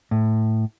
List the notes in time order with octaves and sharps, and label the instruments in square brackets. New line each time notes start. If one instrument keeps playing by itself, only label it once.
[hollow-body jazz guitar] A2